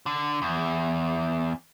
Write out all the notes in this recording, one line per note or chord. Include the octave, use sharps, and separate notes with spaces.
D3
E2